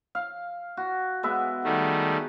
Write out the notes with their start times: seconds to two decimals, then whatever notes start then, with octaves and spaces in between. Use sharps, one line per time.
0.15 F5
0.77 F#4
1.23 G#3 B3 E5
1.64 D#3 G3 A3